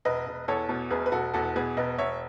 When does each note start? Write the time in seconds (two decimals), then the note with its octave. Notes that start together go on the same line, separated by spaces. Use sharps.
0.05 E1 B4 D#5
0.27 E1
0.48 E2 A4 C#5
0.69 B2
0.90 E1 G#4 B4
1.06 B4
1.12 E1 F#4 A4
1.34 E2 F#4 A4
1.56 B2 G#4 B4
1.77 E1 B4 D#5
1.98 E1 C#5 E5